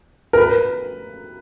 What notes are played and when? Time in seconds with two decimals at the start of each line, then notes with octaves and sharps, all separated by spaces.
0.33 A#4
0.37 B4